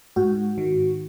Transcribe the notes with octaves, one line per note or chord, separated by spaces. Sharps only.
G#2 F#4
D#3